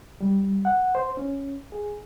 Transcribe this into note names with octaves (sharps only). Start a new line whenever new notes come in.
G3
F#5
C5
C#4
G#4